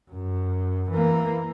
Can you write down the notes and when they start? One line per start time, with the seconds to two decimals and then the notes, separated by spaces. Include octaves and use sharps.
0.11 F#2
0.91 E3 A#3